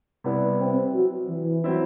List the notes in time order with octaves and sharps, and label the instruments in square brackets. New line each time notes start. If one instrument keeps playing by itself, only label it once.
[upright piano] C3 G3 B3 E4
[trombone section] C4
F#3
E3
[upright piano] F#3 C4 E4